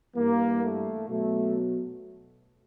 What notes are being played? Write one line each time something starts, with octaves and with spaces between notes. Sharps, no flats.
G2 E3 G3 A#3
A3
B2 F#3 A3